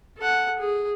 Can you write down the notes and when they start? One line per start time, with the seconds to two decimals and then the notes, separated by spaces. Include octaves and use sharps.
0.18 A4 F#5
0.59 G#4